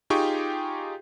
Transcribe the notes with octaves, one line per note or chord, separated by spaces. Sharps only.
D#4 F4 G4 G#4 G5 C#6